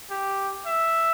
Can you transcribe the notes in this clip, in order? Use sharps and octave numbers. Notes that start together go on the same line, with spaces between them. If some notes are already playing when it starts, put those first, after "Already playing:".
G4
E5